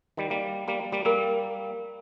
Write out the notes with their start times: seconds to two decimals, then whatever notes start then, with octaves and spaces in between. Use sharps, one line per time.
0.17 D#3 G3
0.30 G3 A#3
0.68 G3 A#3
0.92 G3 A#3
1.05 G3 A#3 A#4